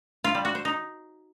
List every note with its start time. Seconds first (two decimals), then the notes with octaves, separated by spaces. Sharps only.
0.24 F4
0.35 G3
0.45 F#4
0.55 C5
0.65 D#4